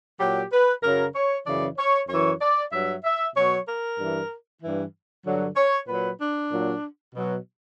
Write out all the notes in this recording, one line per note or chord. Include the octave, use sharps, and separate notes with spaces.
A#2 F#3 G4
B4
F#2 C#3 F#3 A#4
C#5
F#2 C#3 E3 D5
C#5
F#2 E3 C#5
D5
G2 F#3 E5
E5
B2 F#3 C#5
A#4
G2 E3
G2 E3
G2 D3 F#3
C#5
A#2 F#3 B4
D4
A#2 F#3
B2 F#3